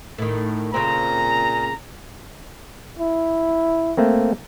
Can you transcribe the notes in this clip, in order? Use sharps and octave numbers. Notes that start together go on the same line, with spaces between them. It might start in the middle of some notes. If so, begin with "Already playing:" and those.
A2 D#3
A#2 C#3 C4 A#5
E4
A3 A#3 C4